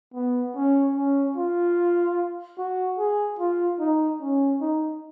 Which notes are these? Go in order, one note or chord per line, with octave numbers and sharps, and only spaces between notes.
B3
C#4
C#4
F4
F#4
G#4
F4
D#4
C#4
D#4